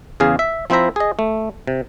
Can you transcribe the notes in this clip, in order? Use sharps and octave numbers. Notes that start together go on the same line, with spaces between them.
E2 C#3 G#4 F5
E5
F3 C4 E4 C5 E5 A#5
G#4 D#5
A3
C3